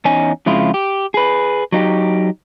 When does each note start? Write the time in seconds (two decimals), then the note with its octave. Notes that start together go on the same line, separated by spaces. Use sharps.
0.05 E2 C#4 D#4 G#5
0.46 F2 C#3 G#3 E4 F4
0.74 G4
1.14 G#4 B4
1.72 F#3 D#4 G4